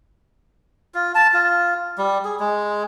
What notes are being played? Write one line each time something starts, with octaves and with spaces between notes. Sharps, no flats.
F4
A5
F4
G3
G#4
G#3